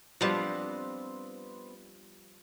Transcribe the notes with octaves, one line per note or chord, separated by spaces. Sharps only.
F3 G3 B3 C4 D4